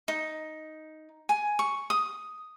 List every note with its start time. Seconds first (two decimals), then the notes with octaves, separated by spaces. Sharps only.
0.08 D#4
1.29 G#5
1.59 C#6
1.90 D#6